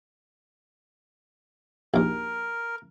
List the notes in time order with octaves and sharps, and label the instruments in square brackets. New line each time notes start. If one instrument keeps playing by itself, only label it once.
[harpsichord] A#1 D#2 [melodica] A#4